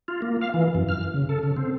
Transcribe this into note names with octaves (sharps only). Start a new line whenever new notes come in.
F4
A#3
F5
E3
F#2
F6
C#3
A4
C#3
C4